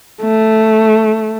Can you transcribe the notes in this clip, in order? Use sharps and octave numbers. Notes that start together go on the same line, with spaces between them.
A3